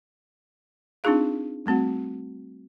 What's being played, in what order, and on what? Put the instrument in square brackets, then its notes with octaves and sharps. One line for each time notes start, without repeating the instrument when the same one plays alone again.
[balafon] C4 D4 D#4 F4 G#4 F5
G3 A3 C4 F#4 F#5